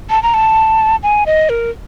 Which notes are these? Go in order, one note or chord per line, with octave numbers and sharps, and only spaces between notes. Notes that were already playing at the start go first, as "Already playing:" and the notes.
A5
A#5
A5
G#5
D#5
A#4